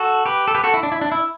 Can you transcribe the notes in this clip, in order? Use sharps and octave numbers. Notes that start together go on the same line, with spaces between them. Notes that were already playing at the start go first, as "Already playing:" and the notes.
Already playing: F#4 A4
G4 B4
A4
G4 B4
F#4 A4
E4
D4
E4
D4
E4